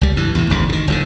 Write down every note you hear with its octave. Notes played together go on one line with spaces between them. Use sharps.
C#2 G3
G2 E3
E2 A2
G#1 D2 C#3
B2 D#3
F#1 E2 B2 D3